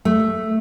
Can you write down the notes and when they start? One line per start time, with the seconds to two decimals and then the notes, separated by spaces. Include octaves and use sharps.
0.05 A3